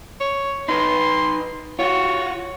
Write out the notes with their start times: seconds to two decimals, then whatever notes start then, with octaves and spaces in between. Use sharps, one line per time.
0.20 C#5
0.69 D#4 B4 C6
1.79 F4 F#4 C#5